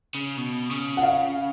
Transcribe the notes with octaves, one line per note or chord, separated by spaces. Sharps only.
C#3
B2
C#3
F#5
F5